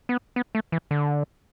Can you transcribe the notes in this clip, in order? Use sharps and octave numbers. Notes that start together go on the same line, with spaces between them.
B3
B3
A3
E3
D3